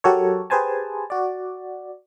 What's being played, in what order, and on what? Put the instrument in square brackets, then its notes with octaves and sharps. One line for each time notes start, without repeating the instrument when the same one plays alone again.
[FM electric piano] F#3 F#4 G4 A4 A#4 C#5
G4 G#4 B4 C5 G#5 A5
F#4 D5